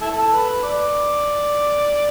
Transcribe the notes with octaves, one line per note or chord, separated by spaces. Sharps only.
E4 A4
B4
D5